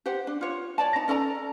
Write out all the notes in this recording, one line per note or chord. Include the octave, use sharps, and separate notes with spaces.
G4 C5 F#5
D4
F4 C#5
C#5 D5 A5
D#4 A#5
C#4 A4 D5 A#5